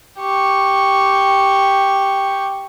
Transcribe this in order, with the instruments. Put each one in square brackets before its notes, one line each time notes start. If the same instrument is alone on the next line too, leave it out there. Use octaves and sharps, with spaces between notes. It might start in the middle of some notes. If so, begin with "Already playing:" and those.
[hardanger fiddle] G4 C#6